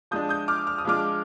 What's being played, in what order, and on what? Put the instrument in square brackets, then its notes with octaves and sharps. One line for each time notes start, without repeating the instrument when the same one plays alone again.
[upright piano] F3 G#3 D4 D#6 G6
D#6 G6
D6 F6
F6
D#6
F3 G#3 D4 D6 F6